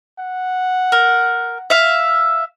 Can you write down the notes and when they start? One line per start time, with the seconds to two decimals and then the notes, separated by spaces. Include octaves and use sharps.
0.19 F#5
0.92 A#4
1.70 E5 F5